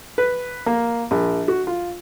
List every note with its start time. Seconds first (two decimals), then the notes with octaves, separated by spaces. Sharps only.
0.18 B4
0.66 A#3
1.11 A#1
1.48 F#4
1.67 F4